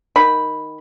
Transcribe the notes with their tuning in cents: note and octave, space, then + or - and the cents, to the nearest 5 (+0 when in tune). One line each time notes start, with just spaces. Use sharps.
D#3 +5 B5 +0